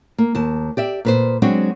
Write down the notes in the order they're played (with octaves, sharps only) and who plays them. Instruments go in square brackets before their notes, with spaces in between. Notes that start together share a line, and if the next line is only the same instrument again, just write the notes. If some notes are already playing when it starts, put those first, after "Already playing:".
[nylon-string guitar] A#3
D#2 A5
G4 D5 E5
A#2 B4 C5
F#3 G#3 C4 D4 F#4